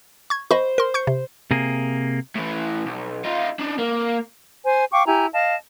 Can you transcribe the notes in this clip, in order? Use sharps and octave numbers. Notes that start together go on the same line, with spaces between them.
C#6 G#6
C5 D#5 B5 C#6
A#4 C6
C#6 G6 C#7
C3
C3 A#3 G#4
A2 E3
B1
D#4 F4
D4 D#4
A#3
C5 G#5
F5 G5 C#6 D6
E4 G4 G#5 A#5
D#5 F5 A5